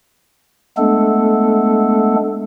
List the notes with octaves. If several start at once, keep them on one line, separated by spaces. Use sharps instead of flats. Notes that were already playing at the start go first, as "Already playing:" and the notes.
G#3 A3 B3 D4 A4